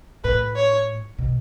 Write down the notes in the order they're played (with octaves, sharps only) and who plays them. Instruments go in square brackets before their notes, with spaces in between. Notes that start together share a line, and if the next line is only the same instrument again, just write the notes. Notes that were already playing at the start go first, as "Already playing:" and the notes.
[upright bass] A2 [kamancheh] B4
[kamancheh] C#5
[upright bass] B2